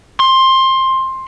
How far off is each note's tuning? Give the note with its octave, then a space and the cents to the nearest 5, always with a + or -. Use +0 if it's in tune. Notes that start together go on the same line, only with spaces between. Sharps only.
C6 +15